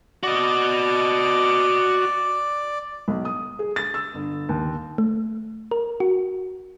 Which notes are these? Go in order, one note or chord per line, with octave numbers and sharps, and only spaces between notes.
F#4 D5 D#5
B1
D#6
G#4
A6
E6
G1
D#2
A3
A#4
F#4